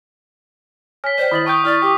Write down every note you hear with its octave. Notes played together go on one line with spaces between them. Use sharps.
C#5 G#5 F6 B6
C5 D5 G5
D#3 E4 D#5 D#6 A6 F#7
G5 A5 C#6 D#6 G6
E4 D5 F6
G4 G5 D6